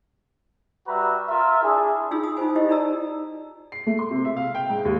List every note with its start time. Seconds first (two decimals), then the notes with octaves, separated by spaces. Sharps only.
0.87 G3 F#4 B4 E5 A#5
1.29 F4 A#4 E5
1.62 D4 E4 G#4
2.11 D4 D#4 F4 G#4 C6 E6
2.24 D#6
2.37 D#4 F4 A4 C5 G#5
2.56 E4 F4 G4 A4 C5 D#5
2.69 D#4 A4 D5 A#5 E6
3.72 C7
3.86 A3
3.99 C6
4.11 C3
4.25 E5
4.37 F5
4.55 G5
4.70 G#2
4.85 D#2